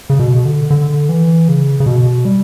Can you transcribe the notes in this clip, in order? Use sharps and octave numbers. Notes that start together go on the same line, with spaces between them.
C#3
B2
D3
D3
E3
C#3
C#3
B2
G3